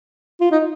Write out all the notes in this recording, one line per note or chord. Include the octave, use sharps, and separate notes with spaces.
F4
D#4